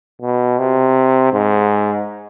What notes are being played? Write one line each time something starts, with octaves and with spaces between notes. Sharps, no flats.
B2
C3
G#2